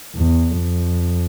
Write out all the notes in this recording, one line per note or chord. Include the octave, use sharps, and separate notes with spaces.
E2
F2